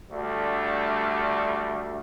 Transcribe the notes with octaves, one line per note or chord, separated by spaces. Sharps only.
D2 D3 G3 A3